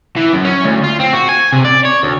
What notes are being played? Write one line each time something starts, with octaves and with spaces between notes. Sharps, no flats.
E3
F#2
C#4
D2
F4
C4
F#4
G#5
C3
D5
C#5
D2